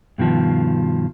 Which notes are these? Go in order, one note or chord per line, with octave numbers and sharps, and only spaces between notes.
G2 B2 D#3 F3